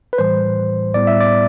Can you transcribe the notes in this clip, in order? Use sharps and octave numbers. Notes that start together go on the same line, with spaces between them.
B4
A2 E3 G3 C5
A2 G3 B3 E4 D5
E5
D5